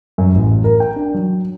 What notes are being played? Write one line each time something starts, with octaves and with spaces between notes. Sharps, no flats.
F#2
A1
A#4
G5
D4
F#3